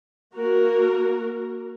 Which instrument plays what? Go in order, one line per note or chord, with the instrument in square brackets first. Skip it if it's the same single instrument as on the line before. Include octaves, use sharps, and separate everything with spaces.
[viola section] A#3 F#4 A#4